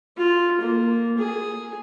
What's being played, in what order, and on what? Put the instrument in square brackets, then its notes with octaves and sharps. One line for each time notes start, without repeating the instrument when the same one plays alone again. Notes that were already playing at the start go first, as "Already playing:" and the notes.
[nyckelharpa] F4
A#3
G#4